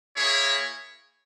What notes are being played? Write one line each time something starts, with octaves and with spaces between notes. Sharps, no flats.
A#3 E4 G#4 C#5